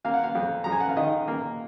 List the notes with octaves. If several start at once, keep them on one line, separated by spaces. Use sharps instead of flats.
A#3 F5
F#5
F5
F2
F2 A#5
G#5
F#5
F5
D#3 D#5
A#3